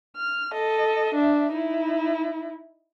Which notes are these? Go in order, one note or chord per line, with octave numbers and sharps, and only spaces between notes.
F6
A4 D#5
D4 E5
D#4 E4